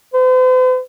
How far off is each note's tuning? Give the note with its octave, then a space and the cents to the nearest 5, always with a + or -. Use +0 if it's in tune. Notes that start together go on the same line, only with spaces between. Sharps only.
C5 -45